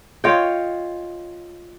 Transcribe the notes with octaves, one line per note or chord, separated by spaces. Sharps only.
F4 C#5 D#5 G5